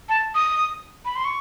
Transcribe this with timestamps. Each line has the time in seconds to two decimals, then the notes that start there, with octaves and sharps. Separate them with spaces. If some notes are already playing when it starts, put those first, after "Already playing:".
0.09 A5
0.35 D#6
1.05 B5
1.16 C6
1.25 C#6